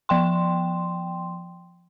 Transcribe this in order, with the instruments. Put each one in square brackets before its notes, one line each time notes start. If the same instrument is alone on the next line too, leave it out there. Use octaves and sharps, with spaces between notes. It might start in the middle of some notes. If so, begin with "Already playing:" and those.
[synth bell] F3 G5 C6